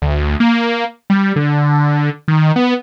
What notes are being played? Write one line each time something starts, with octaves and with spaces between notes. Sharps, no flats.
D2
A#3
G3
D3
D#3
B3